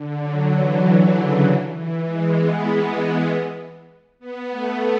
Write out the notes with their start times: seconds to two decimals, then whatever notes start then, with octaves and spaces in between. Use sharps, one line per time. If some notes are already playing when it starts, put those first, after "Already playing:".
Already playing: D3
0.22 F#3
0.53 E3
0.83 D3
1.14 C#3
1.45 E3
1.75 E3
2.06 G#3
2.37 B3
4.19 B3
4.51 A3